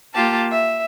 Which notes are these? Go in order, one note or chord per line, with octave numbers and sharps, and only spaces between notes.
A#3 F4 G4 A5
E5